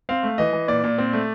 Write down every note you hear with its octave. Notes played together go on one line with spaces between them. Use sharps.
C4 F5
A3
E3 D#5
E3
A#2 D5
A#2
C4
A3